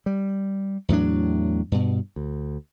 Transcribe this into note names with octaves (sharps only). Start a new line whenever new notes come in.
G3
E2 A2 F#3 D4
G2 B2
D2